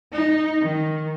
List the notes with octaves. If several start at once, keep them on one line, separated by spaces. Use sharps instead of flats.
D#4
D#3